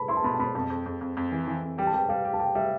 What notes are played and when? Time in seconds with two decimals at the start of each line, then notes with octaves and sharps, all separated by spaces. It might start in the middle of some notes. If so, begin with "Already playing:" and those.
Already playing: A5 B5
0.08 E4 C6
0.17 A5
0.24 B2 B5
0.34 A5
0.39 B2 B5
0.55 F2 A5
0.70 F2
0.86 F2
1.01 F2
1.17 F2
1.32 E3
1.48 E3
1.63 F2
1.78 G3 G5
1.87 A5
1.94 G3 G5
2.09 G3 F5
2.25 G4
2.33 A5
2.39 G4 G5
2.55 G3 E5